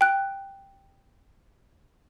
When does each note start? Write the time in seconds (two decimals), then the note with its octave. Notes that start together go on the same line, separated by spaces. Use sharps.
0.01 G5 F#6